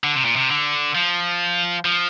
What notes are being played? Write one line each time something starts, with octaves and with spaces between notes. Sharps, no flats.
D3
C3
A#2
C3
D3
F3
F3